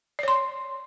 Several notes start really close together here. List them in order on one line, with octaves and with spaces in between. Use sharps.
D5 C#5 C6